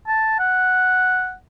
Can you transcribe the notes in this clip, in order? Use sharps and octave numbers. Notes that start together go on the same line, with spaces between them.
A5
F#5